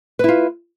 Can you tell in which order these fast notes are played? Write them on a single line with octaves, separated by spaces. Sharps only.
B4 E4 F4